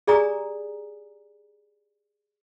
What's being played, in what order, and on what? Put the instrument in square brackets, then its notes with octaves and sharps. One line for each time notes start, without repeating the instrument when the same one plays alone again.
[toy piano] G4 G#4 D5 G#5 A#5 D#6